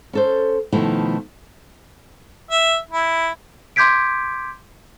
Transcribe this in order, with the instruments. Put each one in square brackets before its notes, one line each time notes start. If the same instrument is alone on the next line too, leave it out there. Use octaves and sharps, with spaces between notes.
[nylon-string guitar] C#4 A4 C5
B2 D#3 F3 A3 E4
[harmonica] E5
E4
[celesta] C6 D6 G6 G#6 B6 D7